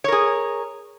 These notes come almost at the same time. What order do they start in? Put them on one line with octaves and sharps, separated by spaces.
C#5 A#4 G#4